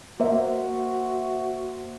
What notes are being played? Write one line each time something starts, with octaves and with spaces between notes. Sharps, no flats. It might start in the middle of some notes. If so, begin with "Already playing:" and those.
A#3 F#4 C5 E5